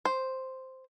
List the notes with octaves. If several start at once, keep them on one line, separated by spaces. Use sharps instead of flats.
C5